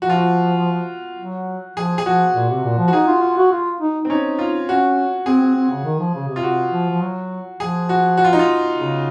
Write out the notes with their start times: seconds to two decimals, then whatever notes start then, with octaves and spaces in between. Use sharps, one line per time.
0.02 F3 F#4
0.10 F4
0.17 F#4
1.18 F#3
1.76 F3 G#4
1.98 G#4
2.05 F3 F#4
2.35 A#2
2.50 C3
2.64 A#2
2.79 F3
2.88 F#4
2.93 D#4 G#4
3.07 F4
3.22 F4
3.37 F#4
3.52 F4
3.81 D#4
4.05 C4
4.10 C#4 D#4
4.39 F4
4.68 C#4 F#4
5.26 C4 G#4
5.41 C4
5.56 C4
5.70 C#3
5.85 D#3
6.00 F3
6.14 C#3
6.28 C3
6.36 F4
6.43 C3 F#4
6.72 F3
6.90 F3
7.02 F#3
7.60 F3 G#4
7.89 F#4
8.17 F#4
8.25 F4
8.33 D#4
8.39 F4
8.76 C#3